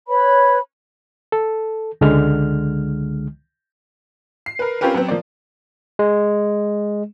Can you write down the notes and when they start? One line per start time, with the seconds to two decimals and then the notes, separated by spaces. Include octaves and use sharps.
0.08 B4 C#5 B5
1.32 A4
2.01 C#2 D3 G#3 F6
4.46 C7
4.59 A#4 B4
4.81 C4 C#4 F4 G4 A#4 B4
4.95 F#3 B3 C4
5.08 F3 A#3 D5
5.99 G#3